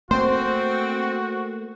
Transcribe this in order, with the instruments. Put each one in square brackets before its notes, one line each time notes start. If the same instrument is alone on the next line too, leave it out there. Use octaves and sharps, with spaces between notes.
[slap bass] A3 A#3 [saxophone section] C4 [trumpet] F#4 [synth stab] C5